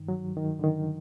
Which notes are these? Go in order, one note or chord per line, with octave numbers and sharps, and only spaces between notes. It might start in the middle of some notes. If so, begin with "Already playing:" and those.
Already playing: G2 D#3
F#3
D#3
D3
D#3